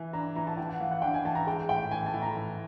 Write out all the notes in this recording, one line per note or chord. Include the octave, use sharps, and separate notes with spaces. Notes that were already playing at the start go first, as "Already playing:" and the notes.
Already playing: E3 G#5
D4 A#5
E3 A#5
A5
E3 G5
F#5
E3 F5
F#5
D4 G5
G#5
E3 A5
A#5
G#3 G5
A2 G5
E3 G#5
A5
A2
A#5
E3